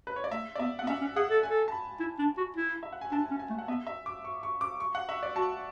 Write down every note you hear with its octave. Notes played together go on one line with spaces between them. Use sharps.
B4
C#5
D5
A3 E5
D5
B3 E5
F#5
B3
C#4 E5
C#4
G#4 F#5
A4
A4 G#5
A5
B5
E4
D4
F#4
E4
E5
F#5
G#5
D4 A5
G#5
C#4
G#5
A3
F#5
B3 E5
E5
D6
C#6
C#6
D6
C#6
F#5
E5
D5
F#4 A5